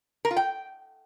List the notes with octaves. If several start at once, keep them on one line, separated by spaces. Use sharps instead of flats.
A#4
F4
G5